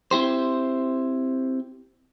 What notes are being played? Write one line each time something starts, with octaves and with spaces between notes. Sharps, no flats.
C4 E4 G4 C5